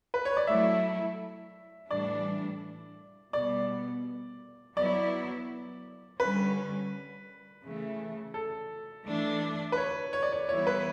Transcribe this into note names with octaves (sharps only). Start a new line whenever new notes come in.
B4
C#5
D5
F#3 A3 E4 E5
A2 E3 G3 D4 D5
B2 G3 B3 D5
F#3 B3 E4 D5
D3 G3 C#4 B4
C#3 E3 A3
A4
E3 A3 D4
B4
C#5
C#5
D5
C#5
E3 G3 B3 E4 C#5
B4